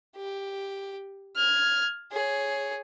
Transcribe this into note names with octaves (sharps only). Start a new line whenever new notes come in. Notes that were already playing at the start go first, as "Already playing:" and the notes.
G4
F6 G#6
G#4 C#5